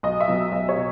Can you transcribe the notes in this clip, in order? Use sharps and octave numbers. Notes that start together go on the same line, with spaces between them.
B1 D#5
E5
B2 F#3
B1 D#5
C#5
B2